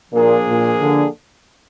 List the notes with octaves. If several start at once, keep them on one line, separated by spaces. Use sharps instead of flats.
A#2 F3 A#3 D4 G#4
A#2
D3